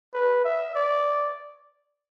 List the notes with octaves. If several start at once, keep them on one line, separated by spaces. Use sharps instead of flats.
B4
E5
D5